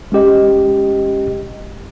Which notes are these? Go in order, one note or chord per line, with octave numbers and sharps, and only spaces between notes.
G#3 C#4 G4 D#5